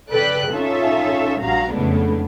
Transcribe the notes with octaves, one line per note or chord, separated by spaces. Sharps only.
C#3 A4 B4 D5 G5 F#6
C#4 D#4 F4 A4 E5
A#1 G2 F#4 F5 A#5
F2 A2 C#3 G#3 B3 D4